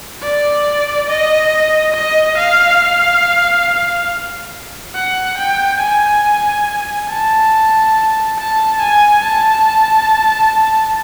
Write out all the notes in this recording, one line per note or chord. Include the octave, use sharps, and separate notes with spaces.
D5
D#5
D#5
F5
F#5
G5
G#5
A5
A5
G#5
A5